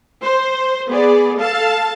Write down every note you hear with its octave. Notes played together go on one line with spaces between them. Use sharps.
C5
B3 G#4 D5
A4 F5 A5